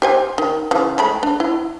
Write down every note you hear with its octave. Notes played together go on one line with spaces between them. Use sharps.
G4 C5 G#5
D#3
C#3 E3
G#3 A3 B5
D4
E4